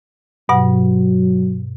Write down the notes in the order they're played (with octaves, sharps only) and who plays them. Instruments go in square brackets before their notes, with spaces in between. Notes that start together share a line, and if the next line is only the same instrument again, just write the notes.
[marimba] G2 B2 F#5 [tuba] F#3